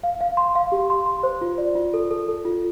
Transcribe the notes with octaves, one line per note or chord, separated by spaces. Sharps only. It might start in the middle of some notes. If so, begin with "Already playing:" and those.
F5
F5
C6
F5
G4
C6
C6
C5
F4
D5
F4
A4
A4
A4
F4